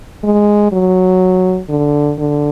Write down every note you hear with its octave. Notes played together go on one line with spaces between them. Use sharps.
G#3
F#3
D3
D3